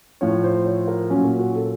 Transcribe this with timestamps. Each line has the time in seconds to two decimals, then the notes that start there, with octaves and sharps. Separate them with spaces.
0.21 A2 F3 C#5
0.44 C5
0.66 C#5
0.88 A#4
1.10 A#2 F#3 C#4
1.24 A#3
1.39 F#4
1.55 A4